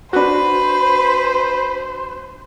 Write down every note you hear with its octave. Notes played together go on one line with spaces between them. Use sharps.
D4 F#4 B4 C5